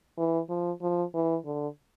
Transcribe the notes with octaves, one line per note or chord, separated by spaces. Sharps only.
E3
F3
F3
E3
D3